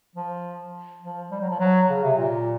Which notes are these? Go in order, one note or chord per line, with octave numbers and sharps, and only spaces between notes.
F3
F3
G3
F#3
F3
F#3
C#3
C3
A#2